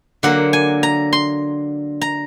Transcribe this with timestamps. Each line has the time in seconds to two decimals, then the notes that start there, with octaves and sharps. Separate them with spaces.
0.23 D3 F#3 A#3 F#5
0.53 G#5
0.83 A#5
1.13 C6
2.01 A#5